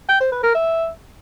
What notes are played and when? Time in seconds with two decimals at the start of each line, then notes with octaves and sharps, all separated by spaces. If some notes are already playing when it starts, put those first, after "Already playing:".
0.09 G5
0.21 C5
0.32 B4
0.43 A#4
0.55 E5